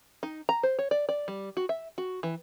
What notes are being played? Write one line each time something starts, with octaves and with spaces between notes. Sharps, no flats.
D#4
A#5
C5
C#5
D5
D5
G3
F#4
E5
F#4
E3